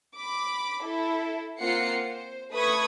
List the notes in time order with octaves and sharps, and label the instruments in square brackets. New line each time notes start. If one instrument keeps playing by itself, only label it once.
[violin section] B5 D6
E4 A4
A#3 C4 F4 F#5 C7 C#7
C5
A3 B4 B5 C#6 D#6 G#6